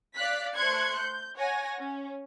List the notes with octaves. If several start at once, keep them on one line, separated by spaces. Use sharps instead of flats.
D5 F5 F#6 B6
A3 C5 C6 F#6 G#6 C#7
G6
C#5 F#5 G#5 A#6
C#4